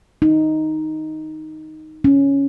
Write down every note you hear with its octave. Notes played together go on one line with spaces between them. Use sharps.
D#4
C#4